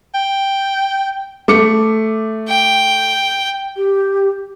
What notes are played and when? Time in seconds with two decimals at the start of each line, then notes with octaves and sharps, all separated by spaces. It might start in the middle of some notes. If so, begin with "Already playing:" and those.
0.14 G5
1.48 A3 D6 C#7
2.49 G5
3.77 G4